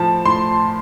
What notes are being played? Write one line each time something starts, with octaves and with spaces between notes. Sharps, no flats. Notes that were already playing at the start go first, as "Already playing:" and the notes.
Already playing: A2 F3 A5
A2 C6